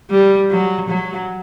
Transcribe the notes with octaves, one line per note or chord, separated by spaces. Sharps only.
G3
F#3
F#3